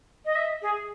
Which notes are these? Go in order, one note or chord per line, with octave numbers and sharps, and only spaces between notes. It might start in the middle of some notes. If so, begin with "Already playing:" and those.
D#5
E5
G#4